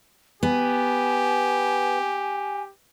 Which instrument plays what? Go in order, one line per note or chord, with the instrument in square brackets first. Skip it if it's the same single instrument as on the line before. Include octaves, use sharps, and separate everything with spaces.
[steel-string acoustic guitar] B3 [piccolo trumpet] G4 [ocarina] G#5